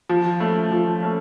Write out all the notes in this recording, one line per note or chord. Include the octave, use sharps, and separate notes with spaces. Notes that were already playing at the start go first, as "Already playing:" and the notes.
F3
A3 C#4
F3
A3 C#4